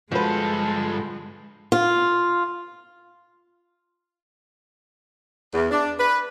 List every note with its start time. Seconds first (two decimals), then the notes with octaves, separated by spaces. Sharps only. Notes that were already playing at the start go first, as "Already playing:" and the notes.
0.12 G2 F3 G#3 F#4 A4 B4
1.72 F4
5.54 E2
5.71 D4
5.99 B4